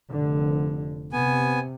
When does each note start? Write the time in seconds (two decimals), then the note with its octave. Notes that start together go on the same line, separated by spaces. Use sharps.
0.12 F1 D3
1.13 C3 B3 G#5